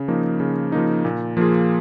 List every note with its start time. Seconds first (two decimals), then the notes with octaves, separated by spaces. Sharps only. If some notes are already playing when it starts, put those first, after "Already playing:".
Already playing: C#3
0.08 F3 A#3 D#4
0.40 C#3
0.72 F3 A#3 D#4
1.05 A#2
1.37 F3 A#3 F4 G#4